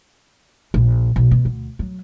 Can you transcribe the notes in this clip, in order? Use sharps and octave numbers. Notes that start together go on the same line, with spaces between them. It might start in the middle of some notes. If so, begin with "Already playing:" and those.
A#1
B1
B2
D2
F#3